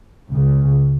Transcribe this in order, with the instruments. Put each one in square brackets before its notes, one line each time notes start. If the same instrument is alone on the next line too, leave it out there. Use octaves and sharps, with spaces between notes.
[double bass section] C#2 C#3